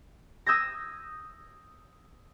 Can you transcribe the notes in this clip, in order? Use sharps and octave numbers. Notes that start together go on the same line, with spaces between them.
D#6 E6 G6 G#6 A#6